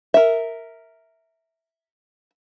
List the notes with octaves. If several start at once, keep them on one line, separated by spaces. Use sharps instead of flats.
A#4 E5